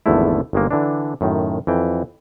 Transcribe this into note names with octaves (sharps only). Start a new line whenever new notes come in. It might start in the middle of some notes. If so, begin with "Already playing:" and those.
G#1 E2 D3 F3 A3 E4
G1 D#3 G#3 A#3
D3 E3 D4
F#2 A2 D#3
F2 E3 G5